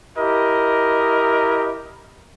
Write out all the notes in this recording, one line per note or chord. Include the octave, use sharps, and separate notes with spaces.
E4 G4 A#4 D#5